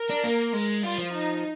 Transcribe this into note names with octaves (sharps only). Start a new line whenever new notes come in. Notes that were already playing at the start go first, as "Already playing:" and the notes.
Already playing: A#4
D4
A#3
G#3
G3 F4
F3
D#4